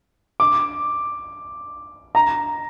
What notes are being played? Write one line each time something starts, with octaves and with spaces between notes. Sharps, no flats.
D6
A#5